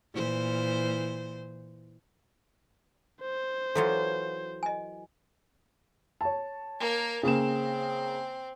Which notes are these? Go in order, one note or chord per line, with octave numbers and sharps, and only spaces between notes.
A#2 E3 C5
C5
E3 F#3 F4 A4
D#5 G#5
C#5 A5
A#3 A#4
C#3 A#3 C4 E7